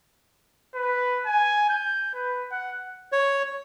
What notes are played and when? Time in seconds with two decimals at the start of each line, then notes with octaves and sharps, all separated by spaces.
0.74 B4
1.26 G#5
1.69 G6
2.14 B4
2.51 F#5
3.12 C#5